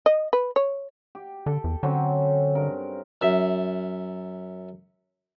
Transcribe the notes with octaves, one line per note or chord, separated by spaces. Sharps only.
D#5
B4
C#5
G4
D3 A4
E2
D3 F#3 C4 C#4
G2 A#4
F#2 E5